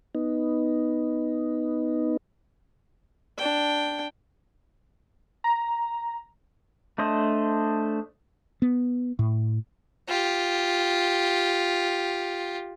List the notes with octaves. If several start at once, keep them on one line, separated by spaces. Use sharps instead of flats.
B3 D#4
D4 G5
A#5
A3 D4 C5 D#5
B3
A2
F4 G4